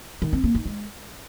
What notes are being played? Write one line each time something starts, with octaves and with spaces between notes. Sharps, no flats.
D#3
C4
A#3
D#4
G#3